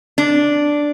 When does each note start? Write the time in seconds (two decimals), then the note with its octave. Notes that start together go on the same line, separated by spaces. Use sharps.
0.18 D4